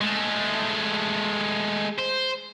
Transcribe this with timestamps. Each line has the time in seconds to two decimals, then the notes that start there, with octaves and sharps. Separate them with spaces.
0.01 G#3 A3
1.98 C5